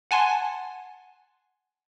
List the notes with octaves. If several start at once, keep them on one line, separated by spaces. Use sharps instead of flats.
F#5 G#5 A5 C6